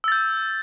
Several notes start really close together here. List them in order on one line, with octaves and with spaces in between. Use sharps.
E6 A6 G6